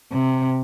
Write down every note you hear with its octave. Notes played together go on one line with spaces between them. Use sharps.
C3